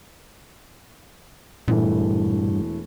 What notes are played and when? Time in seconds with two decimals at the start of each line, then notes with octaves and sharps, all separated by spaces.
1.68 E1 G2 A#2 E3 A3